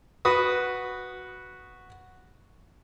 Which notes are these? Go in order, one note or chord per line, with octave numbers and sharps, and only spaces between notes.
F#4 B4 D#6